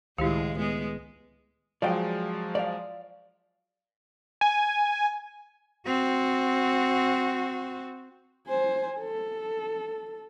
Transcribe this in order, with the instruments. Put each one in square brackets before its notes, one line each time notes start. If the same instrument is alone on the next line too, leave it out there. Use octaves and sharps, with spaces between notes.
[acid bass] C#2 [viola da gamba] A2 G#3 F4 [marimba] D#3 [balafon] E4 G4 F5
[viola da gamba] G#3 B3
[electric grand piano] F3 F#3 G#3 [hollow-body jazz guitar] D5 F5 G5
[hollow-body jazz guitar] D5 F5
[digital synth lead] G#5
[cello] C4 F#4
[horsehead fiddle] C5 G#5
A4